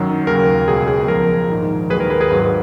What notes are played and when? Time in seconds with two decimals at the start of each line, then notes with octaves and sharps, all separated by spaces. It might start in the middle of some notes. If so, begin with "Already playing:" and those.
Already playing: F#2 D#3 F#3
0.27 D#2 C#3 F#3 A#4
0.67 C#2 B2 F#3 G#4
0.88 G#4
1.08 C#2 C#3 F3 A#4
1.50 A#1 G#2 D#3
1.90 D#2 D#3 F#3 G#4 B4
2.00 A#4
2.10 G#4 B4
2.21 G#4 B4
2.30 G#1 G#2 F#3